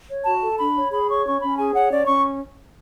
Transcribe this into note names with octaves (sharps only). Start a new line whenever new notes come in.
C#5
F#4 A5
A4
D4 B5
C#5
G#4 B5
C#5 C#6
C#4 C#6
C#4 B5
G#4 G#5
C#5 F#5
C#4 D5
C#4 C#6